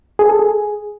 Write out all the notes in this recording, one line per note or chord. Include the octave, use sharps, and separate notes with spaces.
G#4
A4
G#4